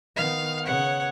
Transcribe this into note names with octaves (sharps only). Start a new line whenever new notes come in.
D#3 B3 F5
C#3 B3 C#5 F#5